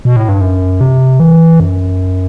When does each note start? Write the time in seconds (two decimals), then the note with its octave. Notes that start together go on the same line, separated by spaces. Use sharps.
0.05 B2
0.16 A2
0.29 G2
0.41 F#2
0.81 C3
1.20 E3
1.60 F#2